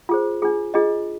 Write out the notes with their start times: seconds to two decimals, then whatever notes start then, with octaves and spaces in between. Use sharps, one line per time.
0.09 F4 G#4 C5
0.42 D4 F4 G#4
0.74 D4 F4 G#4 D#5